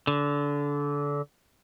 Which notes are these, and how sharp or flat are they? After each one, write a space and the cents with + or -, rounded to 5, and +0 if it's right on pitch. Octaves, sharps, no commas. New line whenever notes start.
D3 -25